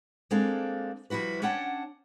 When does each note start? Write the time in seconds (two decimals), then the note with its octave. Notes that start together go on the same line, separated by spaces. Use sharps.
0.31 G#3 A#3 C4 D4 A4 F5
1.10 F3 G3 E4 F#4 B4
1.42 C#4 D4 C#5 F#5 G5 A5